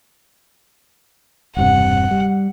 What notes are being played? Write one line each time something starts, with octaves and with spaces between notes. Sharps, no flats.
E1 G2 C3 F#5
G3